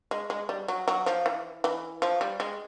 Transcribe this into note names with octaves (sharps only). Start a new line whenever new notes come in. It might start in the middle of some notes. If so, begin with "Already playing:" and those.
G#3
G#3
G3
F#3
F#3
F3
E3
E3
F3
G3
G#3